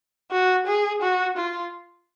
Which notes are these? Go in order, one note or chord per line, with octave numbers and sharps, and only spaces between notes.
F#4
G#4
F#4
F4